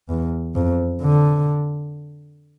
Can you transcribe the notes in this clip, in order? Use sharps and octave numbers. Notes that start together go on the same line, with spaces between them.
E2
F2
D3